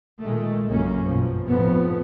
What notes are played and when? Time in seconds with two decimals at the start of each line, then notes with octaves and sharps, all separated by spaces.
0.21 A#2 D#3 G#3 A3
0.67 A#1 F#2 C#3 A#3 C#4
1.06 G2 B2 F3
1.47 F1 F2 A2 F3 B3